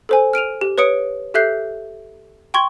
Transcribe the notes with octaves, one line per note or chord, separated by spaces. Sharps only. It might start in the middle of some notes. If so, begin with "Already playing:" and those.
A4 C5 G#5
F6 D7 D#7 F7
G4
B4 C#5 D#6 C#7 D7
G4 A4 E5 F#6 G6 C7
G5 C6 C#6 G#6 G7